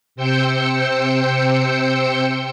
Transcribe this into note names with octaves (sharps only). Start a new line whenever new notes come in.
C3 C5 G5 E6 G6 C#7